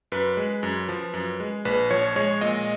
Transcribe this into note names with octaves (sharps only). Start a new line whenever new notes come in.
F#2 B4
G#3
F#2
F3
F#2
G#3
A#1 B4
F3 C#5
G#3 C#5
A#2 D#5